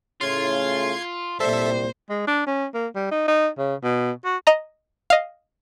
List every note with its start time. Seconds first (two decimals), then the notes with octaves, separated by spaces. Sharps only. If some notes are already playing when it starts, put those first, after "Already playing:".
0.21 A2 C#3 F4 C6 G#6
1.40 C2 A#2 G3 A4 C5 E5
2.10 G#3
2.27 D4
2.47 C#4
2.74 A#3
2.96 G3
3.12 D#4
3.28 D#4
3.58 C#3
3.83 B2
4.25 F#4
4.47 D#5 A#5
5.10 D#5 F5